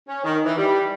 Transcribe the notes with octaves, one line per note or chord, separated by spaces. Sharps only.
C#4
D#3
E3
G3